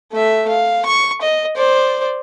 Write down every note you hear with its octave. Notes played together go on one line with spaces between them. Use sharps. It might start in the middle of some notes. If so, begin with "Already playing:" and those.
A3 E5
F5
C#6
D#5
C5 D5